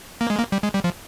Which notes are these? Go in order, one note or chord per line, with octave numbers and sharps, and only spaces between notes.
A#3
G#3
A#3
G3
G#3
G3
F3